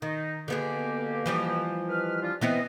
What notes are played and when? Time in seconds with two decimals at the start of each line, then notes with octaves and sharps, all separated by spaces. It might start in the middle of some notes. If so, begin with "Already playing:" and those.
0.02 D#3 D#4
0.48 B2 D3 A#3 B3 G4 G#4
1.26 E3 F3 G3
1.89 D#3 B4 F6
2.22 D4 F4
2.41 E3 B3 C4 E4 D#5